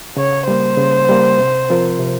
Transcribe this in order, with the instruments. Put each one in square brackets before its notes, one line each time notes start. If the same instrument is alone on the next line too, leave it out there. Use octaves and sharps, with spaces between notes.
[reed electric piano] C#3 [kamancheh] C#5
[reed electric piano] G3 A#3 [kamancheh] C5
[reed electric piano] C#3
G3 A#3
C3
F3 C4 F4 A#4
C3